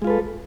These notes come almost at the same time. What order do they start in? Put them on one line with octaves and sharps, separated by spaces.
G#3 F4 B4 A4